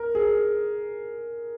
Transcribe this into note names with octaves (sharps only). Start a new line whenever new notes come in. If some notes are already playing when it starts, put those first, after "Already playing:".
Already playing: A#4
G#4